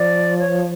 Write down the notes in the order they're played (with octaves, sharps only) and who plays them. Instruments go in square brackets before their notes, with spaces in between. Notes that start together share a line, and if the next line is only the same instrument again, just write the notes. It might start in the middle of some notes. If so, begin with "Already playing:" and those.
Already playing: [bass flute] F3 [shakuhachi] D5
[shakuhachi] C#5